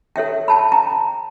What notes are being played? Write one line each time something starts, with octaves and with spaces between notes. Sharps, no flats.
A4 C#5 E5 G5
G5 A5 B5
G5 A#5